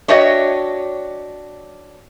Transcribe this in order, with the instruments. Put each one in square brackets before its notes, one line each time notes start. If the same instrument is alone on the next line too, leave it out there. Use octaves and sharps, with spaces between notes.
[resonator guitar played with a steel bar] D4 F#4 G4 C#5 D#5 E5